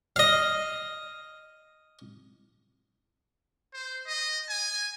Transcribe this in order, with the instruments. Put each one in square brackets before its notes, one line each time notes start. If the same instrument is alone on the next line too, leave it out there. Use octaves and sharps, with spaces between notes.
[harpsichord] D#5 F5
[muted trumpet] C5
D#5
G#5